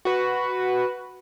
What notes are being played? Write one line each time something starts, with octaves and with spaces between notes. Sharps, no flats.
F#4 B4